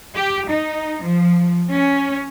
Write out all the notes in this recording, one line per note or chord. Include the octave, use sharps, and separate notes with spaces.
G4
D#4
F3
C#4